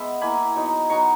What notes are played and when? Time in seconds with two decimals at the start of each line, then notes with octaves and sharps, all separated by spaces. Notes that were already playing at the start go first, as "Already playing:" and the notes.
Already playing: G#3 B3 E5
0.21 A#3 E4 G#5 B5
0.56 F#3 B3 D#4
0.90 F#3 B3 D#4 A#5 C#6